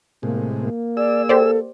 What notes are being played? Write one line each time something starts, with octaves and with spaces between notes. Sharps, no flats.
A2 C3 G#3 A#3
A#3
G#4 D5 E6
G4 A4 C5 D5